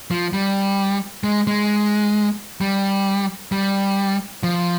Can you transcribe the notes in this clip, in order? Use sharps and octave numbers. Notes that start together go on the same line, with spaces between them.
F3
G3
G#3
G#3
G3
G3
F3